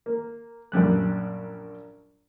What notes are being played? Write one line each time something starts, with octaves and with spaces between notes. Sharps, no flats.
A#3
A#1 F#2 G3 F#6